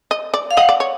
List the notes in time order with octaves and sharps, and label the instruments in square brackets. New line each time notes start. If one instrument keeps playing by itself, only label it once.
[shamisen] D#5
D5
[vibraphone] F5
[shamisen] D#5 [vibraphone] F#5
[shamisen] D5
C#5